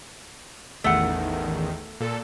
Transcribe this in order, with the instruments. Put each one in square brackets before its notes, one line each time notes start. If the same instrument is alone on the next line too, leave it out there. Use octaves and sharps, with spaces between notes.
[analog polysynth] A1 E2 D#3 [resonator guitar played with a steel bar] A3 F#5
[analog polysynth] A#2 A4